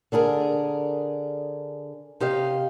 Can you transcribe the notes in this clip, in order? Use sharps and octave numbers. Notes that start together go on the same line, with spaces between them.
D3 D4 G#4 A#4
C3 G4 D#5 F5